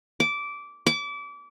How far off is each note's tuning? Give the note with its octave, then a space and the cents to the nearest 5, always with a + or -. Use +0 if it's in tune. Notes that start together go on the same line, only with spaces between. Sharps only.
D6 -15
D6 -30